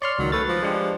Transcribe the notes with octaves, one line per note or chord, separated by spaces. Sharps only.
C#5 D5 C6 F6
C#2 D#3 F#3
A3 B4 A6
F3
G#3 D4 G4